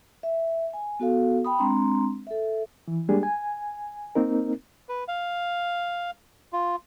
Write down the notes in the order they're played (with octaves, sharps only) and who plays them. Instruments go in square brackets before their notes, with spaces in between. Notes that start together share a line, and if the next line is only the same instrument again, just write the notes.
[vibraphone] E5
G#5
B3 F#4 A4 F5
G5 B5 D#6
G#3 C4 D4 A#5 C6
A4 E5
[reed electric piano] E3
G3 G#3 A#3 D4 G4 G#4
G#5
A#3 C4 D#4 A#4
[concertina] B4
F5
F4